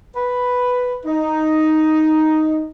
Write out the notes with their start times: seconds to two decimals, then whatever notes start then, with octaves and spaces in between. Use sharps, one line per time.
0.16 B4
1.06 D#4